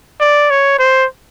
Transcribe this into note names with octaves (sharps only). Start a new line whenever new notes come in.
D5
C#5
C5